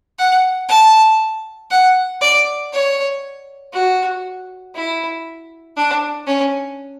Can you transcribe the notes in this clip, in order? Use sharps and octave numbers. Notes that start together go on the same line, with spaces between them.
F#5
A5
F#5
D5
C#5
F#4
E4
D4
C#4